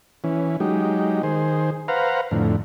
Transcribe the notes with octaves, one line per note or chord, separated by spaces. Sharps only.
E3 C#4
F#3 G#3 D#4 G4
D#3 G#4 C5
B4 C5 F5 F#5 A#5
F2 A2 D3